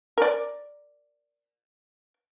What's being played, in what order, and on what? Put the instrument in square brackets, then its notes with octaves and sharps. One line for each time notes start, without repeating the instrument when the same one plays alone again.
[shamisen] A#4 D5